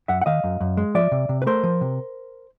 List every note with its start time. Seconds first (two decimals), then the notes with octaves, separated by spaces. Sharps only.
0.08 F#2 E5 F#5
0.21 F#5
0.26 D#3 D#5 F5
0.44 F#2
0.61 F#2
0.77 G#3
0.95 F3 D5 E5
1.12 C3
1.29 C3
1.42 B4
1.47 A3 A#4 C5
1.63 F3
1.81 C3